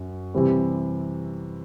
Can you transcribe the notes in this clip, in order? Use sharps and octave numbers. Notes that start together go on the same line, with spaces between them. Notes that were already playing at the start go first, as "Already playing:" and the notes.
Already playing: F#2
C3 E3 G3 C4